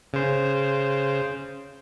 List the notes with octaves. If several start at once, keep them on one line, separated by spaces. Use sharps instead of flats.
C#3 C5